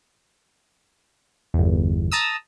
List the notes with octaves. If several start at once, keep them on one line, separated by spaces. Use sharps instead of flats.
G1 E2
A5 A#5 D#6 E6